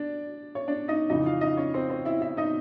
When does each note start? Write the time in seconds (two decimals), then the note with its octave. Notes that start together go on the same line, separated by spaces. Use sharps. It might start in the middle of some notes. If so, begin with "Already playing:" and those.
Already playing: D4 D5
0.55 C#5
0.68 D4 D5
0.88 D#4 D#5
1.09 F2 C#3 E3 D#4 D#5
1.26 F4 F5
1.41 D#4 D#5
1.57 C#4 C#5
1.74 C4 C5
1.89 C4 C5
2.05 E4 E5
2.21 E4 E5
2.37 D#4 D#5